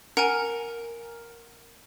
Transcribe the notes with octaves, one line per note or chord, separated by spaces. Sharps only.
A#4 F#5 G#5